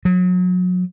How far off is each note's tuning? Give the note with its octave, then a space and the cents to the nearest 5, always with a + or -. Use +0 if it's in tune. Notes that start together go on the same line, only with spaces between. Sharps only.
F#3 -30